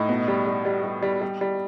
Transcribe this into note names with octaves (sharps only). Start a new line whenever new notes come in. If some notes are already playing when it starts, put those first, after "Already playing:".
Already playing: A2 D#4
B2
G3
G3
G3
G3
G3
G3
G3